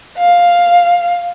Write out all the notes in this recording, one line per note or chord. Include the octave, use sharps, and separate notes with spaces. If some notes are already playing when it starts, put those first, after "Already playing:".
F5